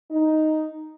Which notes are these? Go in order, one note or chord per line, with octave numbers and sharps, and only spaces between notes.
D#4